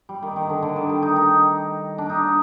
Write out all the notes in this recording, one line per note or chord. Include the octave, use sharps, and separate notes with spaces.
G3
D#3
D#3
D3
D3
D#3
G3
D#4
D#4
D4
D#4